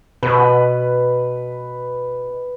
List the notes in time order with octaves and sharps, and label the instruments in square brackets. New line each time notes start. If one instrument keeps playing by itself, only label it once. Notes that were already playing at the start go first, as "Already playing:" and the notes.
[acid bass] B2 [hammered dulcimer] B4